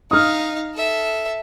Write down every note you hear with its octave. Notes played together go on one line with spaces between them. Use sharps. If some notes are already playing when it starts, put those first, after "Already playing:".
D#4 F5 D#6 F6
A4 E5